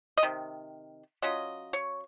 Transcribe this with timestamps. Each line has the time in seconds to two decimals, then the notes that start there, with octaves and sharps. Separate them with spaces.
0.18 D#5
0.23 C3 D#3
1.22 F#3 C#4 F4 D#5
1.73 C#5